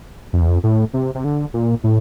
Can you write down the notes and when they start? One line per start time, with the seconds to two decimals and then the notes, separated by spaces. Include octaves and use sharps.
0.33 F2
0.41 E2
0.48 F2
0.64 A2
0.94 C3
1.15 C3
1.24 D3
1.54 A#2
1.84 A2